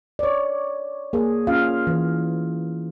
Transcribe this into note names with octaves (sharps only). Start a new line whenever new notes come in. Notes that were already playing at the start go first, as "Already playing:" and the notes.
C#5 D5
A#3 G#4
C#4 F4 F5
E3